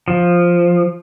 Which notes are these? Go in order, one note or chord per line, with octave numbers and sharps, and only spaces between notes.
F3